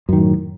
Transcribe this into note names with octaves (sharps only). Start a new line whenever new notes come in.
F#2 A2 D#3